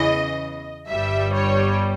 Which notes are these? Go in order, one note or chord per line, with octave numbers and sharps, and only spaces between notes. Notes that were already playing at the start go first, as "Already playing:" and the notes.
Already playing: E2 C#3 E3 D#5
G1 G2 G3 E5
C#5